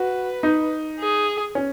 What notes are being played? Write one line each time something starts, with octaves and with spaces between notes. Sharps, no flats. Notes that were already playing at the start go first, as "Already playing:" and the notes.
Already playing: F#4 B4
D#4
G#4
C#4